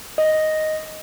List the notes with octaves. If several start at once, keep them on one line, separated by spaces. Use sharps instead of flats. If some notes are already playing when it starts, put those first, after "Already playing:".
D#5